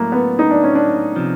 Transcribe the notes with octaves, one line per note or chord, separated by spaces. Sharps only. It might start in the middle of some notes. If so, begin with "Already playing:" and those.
Already playing: A2 F#3 A3 A#3
B3
D#4
D4
C#4
D4
C3 F3